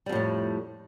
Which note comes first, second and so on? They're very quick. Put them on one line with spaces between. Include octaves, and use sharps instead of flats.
G3 F2 A2 A3